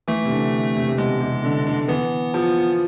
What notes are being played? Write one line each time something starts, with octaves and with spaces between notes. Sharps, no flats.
E3 A3
C3
D3
C3
C3
B2 G#3
C3
D3
D3
E3 B3
F3